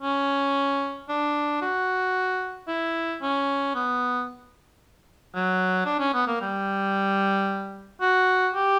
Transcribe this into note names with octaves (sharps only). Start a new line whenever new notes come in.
C#4
D4
F#4
E4
C#4
B3
F#3
D4
C#4
B3
A#3
G3
F#4
G4